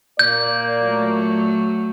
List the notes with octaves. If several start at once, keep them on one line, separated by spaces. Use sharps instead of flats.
A#2 A#3 D5 G6
F#3 A3